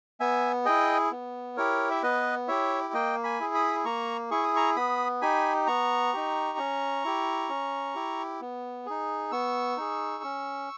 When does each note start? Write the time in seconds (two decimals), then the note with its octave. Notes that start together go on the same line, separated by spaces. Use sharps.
0.20 B3 E5 G#5
0.65 E4 G#4 D#5 G5
1.12 B3
1.57 E4 G4 A#4 C#5
1.91 E5
2.03 B3 B4 D#5
2.48 E4 G4 C#5 E5
2.94 A#3 D#5 G5
3.24 G#5 B5
3.40 E4 G#4
3.54 B5 D#6
3.85 A#3 A#5 C#6
4.31 E4 G#4 C#6
4.43 D#6
4.56 A#5 C#6
4.76 B3 B5 D#6
5.22 D#4 G4 G#5 B5
5.67 B3 A#5 C#6
6.13 D#4 G4
6.58 C#4
7.05 E4 G4
7.49 C#4
7.95 E4 G4
8.41 B3
8.86 D#4 G#4
9.32 B3 C#6 E6
9.77 D#4 G#4
10.24 C#4